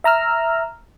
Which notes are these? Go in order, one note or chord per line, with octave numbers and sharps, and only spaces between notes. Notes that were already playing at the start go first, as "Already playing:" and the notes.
E5 A#5 E6 F6